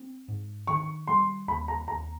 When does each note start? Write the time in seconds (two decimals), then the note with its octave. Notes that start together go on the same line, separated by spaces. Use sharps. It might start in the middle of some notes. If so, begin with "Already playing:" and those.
Already playing: C4
0.28 G#2
0.67 D#3 C#6
1.08 G3 C6
1.48 D#2 B5
1.68 A#5
1.88 D#2 A#5